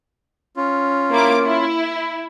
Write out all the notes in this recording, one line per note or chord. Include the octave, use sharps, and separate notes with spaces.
C#4 F4
A#3 E4 D6
E4